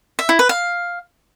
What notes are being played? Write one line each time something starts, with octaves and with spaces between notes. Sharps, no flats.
E5
E4
B4
F5